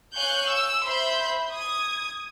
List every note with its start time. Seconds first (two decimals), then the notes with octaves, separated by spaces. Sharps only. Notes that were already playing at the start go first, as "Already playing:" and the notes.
0.14 C#5 F5 G#5 C#6 F#6 G6
0.50 E6
0.86 C5 E5 B5 C6 G6
1.52 D#6 G#6